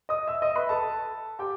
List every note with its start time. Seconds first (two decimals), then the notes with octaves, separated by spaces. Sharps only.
0.09 D#5 D#6
0.27 E5 E6
0.42 D#5 D#6
0.55 B4 B5
0.69 A4 A5
1.39 G4 G5